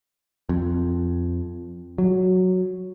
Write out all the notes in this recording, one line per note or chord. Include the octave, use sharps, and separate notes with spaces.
F2
F#3